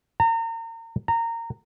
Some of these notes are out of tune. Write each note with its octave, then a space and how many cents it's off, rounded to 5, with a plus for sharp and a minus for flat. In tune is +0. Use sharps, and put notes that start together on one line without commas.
A#5 -35
A#5 -20